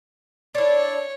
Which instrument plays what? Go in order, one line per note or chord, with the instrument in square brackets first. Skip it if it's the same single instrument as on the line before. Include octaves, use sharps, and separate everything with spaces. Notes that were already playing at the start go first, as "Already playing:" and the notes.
[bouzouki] D4 E4 [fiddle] C#5